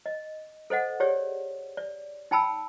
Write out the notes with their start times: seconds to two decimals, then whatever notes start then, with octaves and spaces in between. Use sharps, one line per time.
0.06 D#5
0.70 A4 C5 D#5 F#5
1.00 G4 G#4 C#5 D5
1.77 D5
2.31 D#4 G5 A5 B5 E6